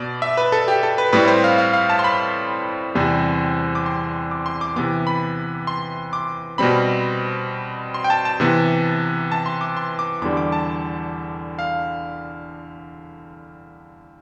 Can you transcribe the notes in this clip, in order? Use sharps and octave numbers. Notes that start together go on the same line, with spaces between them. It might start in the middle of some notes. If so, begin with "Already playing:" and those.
Already playing: B2 B3 D5
E5
B4
A4
G4
A4
B4
A2 G3 C4 B4
C5
F5
F5
F5
A5
C6
B5
E2 C3 G3 C4
D6
C6
D6
C6
D6
C3 E3 B3 D6
B5
C6
D6
B2 G3 C4 B5
C6
G5
A5
A5
C3 E3 B3
A5
C6
D6
C6
D6
E2 D3 G3 D6
D6
A5
F5